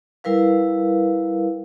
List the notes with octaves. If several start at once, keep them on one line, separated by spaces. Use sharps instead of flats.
G3 E4 A#4 B4 F5